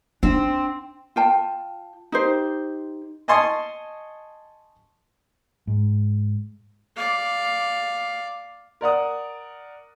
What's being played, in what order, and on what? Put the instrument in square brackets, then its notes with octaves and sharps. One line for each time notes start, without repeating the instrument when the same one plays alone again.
[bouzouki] C4 [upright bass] D4
[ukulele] F4 G5 A5
D#4 G4 C5
[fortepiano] D#5 G#5 A5 C6 C#6 D#6
[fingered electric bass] G#2
[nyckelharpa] D5 F5
[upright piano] A#4 D5 F#5 D#6